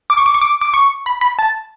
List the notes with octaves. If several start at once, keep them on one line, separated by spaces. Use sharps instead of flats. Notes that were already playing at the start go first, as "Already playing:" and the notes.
D6
C#6
D6
C#6
D6
D6
C#6
B5
B5
A5